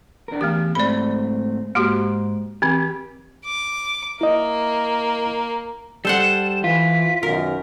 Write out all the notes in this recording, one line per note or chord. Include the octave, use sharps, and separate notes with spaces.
D4 A#4
E2 A3 B3 G4
G#2 A3 C4 D5 B5
G#2 A#3 F#4 G4 C6
E3 C4 G4
D6
A#3 E4 D#5
G3 A4 C5 F#5 E7
E3 F4 B6
F#2 B2 D#3 A#4